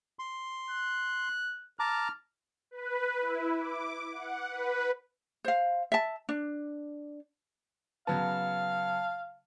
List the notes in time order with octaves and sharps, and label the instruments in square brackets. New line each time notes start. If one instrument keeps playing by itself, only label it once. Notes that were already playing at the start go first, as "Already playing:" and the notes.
[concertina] C6
[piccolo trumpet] F#6
[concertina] A5 A#5 D6 [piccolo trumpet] F6
[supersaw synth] B4
E4
D6
F#5
B4
[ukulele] C5 F5
E5 A5
D4
[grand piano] C#3 F#3 B3 [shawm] F5 [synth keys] A5